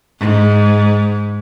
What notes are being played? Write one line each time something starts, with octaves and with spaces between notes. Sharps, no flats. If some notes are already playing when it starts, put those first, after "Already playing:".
G#2